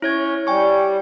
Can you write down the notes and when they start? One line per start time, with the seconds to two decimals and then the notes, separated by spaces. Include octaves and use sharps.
0.02 C#4 E4 C#5 G#6
0.47 G3 G5 G#5 C#6